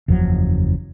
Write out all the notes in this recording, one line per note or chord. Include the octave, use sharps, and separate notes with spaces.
F#1 E2 F3 F#3